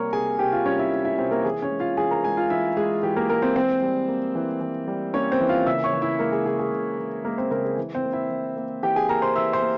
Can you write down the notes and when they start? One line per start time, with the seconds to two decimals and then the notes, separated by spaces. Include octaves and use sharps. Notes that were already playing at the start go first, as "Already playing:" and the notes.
Already playing: C3 G3 A#3 A#4 C#5 A#5 C#6
0.13 C3 G#4 G#5
0.39 C3 G4 G5
0.52 F4 F5
0.66 G3 C#4 C#5
0.79 E4 E5
0.92 A#3
1.05 E4 E5
1.18 C3 C4 C5
1.31 A#3 A#4
1.44 E3 G#4
1.62 C#4 C#5
1.71 G#3
1.80 F4 F5
1.97 E3 G#4 G#5
2.11 A#4 A#5
2.24 G#3 G#4 G#5
2.37 F4 F5
2.50 E3 E4 E5
2.77 G#3 G#4
3.03 E3 G4
3.16 A#3 A#4
3.29 G#3 A#3 A#4
3.42 C4 C5
3.56 E3 C4 C5
3.82 G3
4.08 A#3
4.35 E3
4.60 E3
4.87 G3
5.14 A#3 C#4 C#5
5.32 C4 C5
5.40 E3
5.49 F4 F5
5.67 C#3 E5 E6
5.84 C#5 C#6
5.93 E3
6.02 E4 E5
6.19 G#3 A#3 A#4
6.32 G#4
6.45 C#3 G#4
6.59 G#4
6.72 C#3
6.99 E3
7.24 G#3 A#3 A#4
7.38 C4 C5
7.51 C#3 A#3 A#4
7.64 G#4
7.77 E3
7.95 C4 C5
8.03 A#3
8.13 E4 E5
8.30 E3
8.56 A#3
8.83 E3 G4 G5
8.96 G#4 G#5
9.09 A#3 A#4 A#5
9.22 C5 C6
9.35 E3 E5 E6
9.53 C5 C6
9.62 A#3